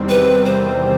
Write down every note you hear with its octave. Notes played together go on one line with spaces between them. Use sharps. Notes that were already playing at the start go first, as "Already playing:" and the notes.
Already playing: E2 C3 D#3 G3 C4
B4
C5